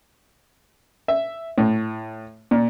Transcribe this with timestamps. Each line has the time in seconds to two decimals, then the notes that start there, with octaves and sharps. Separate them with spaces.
1.08 E5
1.58 A2
2.51 A#2